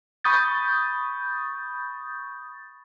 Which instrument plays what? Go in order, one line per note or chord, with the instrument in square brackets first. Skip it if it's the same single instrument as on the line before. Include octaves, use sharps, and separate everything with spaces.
[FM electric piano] B5 C#6 D#6 G6 A6